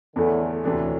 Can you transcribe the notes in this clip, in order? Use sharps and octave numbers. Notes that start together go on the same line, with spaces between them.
E2 A2 D3 E3 A3 E4 A4
D2 A2 C3 E3 A3 D4